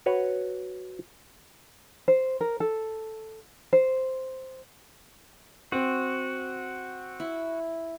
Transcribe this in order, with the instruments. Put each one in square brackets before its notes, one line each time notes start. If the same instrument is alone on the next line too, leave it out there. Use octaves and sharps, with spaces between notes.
[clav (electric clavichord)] F#4 B4 C#5
[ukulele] C5
A#4
A4
C5
[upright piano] C4 [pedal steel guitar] F#4
[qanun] E4